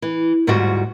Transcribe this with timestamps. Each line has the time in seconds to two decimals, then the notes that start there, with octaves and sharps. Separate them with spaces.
0.02 E3
0.47 D2 G#2 G3 F4 F#4